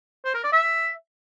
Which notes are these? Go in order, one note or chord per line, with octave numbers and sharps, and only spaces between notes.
C5
A#4
D5
E5